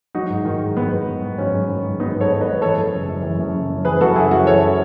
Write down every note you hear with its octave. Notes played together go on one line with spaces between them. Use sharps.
F#3 D#4 F#4
G#2
D#3
G#2
F#3 B3
G#2
D#3
G#2
F#3 C#4
G#2
D#3
G#2
F#3 B3 D#4
G#2
A4 C#5
D#3
B4 D#5
G#2
E3 A4 C#5
F#2
C#3
F#2
E3
F#2
C#3
F#2
E3 G#4 B4
F#2 F#4 A4
C#3 E4 G#4
F#2 F#4 A4
E3 A4 C#5